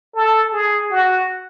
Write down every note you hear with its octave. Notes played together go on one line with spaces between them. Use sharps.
A4
G#4
F#4